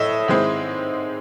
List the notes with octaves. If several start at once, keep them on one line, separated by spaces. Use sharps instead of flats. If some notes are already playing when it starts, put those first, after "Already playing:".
Already playing: A2 D#5 E5
G#2 D#3 G#3 C4 E4